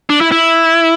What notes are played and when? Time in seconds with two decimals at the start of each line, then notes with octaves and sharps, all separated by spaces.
0.10 D4
0.21 E4
0.32 E4